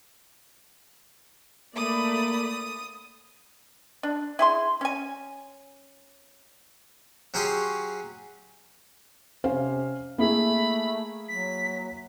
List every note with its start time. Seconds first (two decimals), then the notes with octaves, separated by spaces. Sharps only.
1.76 A3 A#3 D5 B5 D#6
4.03 D4
4.39 E4 G#4 C6
4.81 C#4 G#5
7.34 F#3 C#4 G4 G#4 C6
9.44 C3 C#4 C5 F5
10.18 A3 A#3 E4 G#4 B5
11.28 F#3 B6